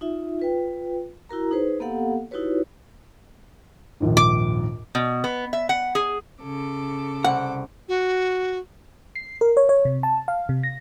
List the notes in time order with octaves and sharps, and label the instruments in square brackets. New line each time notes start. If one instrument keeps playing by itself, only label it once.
[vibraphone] D#4 F4 E5
F4 B4 G5
E4 F#4 A#4 A#5
D#4 G#4 B4 C5
A#3 B3 G4 A4 F5 F#5
D#4 E4 F#4 G4 B4 C#5
[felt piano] A#1 D#2 G#2
[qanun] D6
[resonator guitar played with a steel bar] B2
B3
E5
F#5
G#4
[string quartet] C#3 A4 D6
[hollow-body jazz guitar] C2 F#5
[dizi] F#4
[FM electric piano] C7
A#4
C#5
C#5
C3
A5
F5
C3
A#6